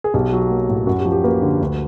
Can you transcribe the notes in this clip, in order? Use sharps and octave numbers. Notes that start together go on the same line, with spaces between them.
G#4
B1 G4
F#3
A#3
A2
F#2 F#4
G4
F3
G4
A#3 B4
D3
D2